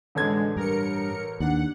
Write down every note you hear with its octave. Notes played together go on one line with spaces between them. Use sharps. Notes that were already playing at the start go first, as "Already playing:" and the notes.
A1 D3 G#3 A4 G#6
G2 A#4 C#7
D#2 D4 F#5